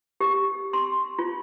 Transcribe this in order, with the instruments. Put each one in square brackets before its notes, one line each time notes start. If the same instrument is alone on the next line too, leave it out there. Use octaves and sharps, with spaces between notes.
[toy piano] G4
C6
F4